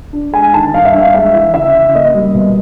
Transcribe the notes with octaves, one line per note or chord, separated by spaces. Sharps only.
D4
G#3 G#5
D#3 A5
G2 F5
E5
G2 F5
G#3 E5
E3
C#3 E5
C#3
A#3 D#5
G3
B2